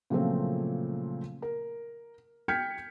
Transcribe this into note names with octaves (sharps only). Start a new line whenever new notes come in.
A#2 C#3 F3 F#3 A3 C4
A#4
G5 F6 G6 G#6 B6 C#7